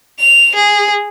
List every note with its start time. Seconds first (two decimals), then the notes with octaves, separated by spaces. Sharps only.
0.19 F7
0.55 G#4